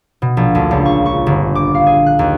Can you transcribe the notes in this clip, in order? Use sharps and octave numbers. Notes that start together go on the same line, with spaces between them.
B2
A#1
D2
C#2
C#6
C#6
G1
D6
F5
G#4
F#6
D#2